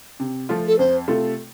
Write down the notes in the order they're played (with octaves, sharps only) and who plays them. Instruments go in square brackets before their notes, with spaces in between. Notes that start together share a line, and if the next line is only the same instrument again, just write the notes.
[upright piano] C3
F3 A3 F4
[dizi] A4
[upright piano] F2 [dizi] C5
[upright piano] C3 A3 F4 A4